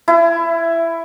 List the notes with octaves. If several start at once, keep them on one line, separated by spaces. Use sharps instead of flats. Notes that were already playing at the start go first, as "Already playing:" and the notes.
E4